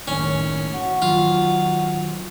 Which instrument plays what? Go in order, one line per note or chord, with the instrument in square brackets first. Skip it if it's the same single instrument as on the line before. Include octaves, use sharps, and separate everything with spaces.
[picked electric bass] F#1 A2 D#3 [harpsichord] C#4
[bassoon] F#4
[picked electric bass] D#3 F#3 [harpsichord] F4